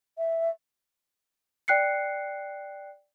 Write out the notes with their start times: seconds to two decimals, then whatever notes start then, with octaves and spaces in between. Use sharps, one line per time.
0.18 E5
1.68 D5 G5 F#6 C7 C#7